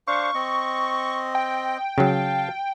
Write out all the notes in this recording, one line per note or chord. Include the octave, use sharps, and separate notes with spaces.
D4 C5 F5 C#6
C4 D#5
G5
C#3 F#3 F5 A5